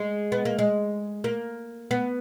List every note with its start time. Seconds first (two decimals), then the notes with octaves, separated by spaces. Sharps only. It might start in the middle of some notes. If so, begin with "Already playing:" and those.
Already playing: G#3
0.32 B3
0.45 A#3
0.59 G#3
1.24 A#3
1.91 B3